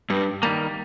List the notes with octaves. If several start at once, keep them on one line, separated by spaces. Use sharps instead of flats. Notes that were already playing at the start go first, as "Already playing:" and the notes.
G2
D#3 G3 A#3